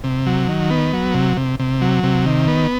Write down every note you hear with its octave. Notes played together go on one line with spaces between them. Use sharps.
C3
F#3
D#3
B3
F#3
C3
C3
C3
F#3
C3
D#3
B3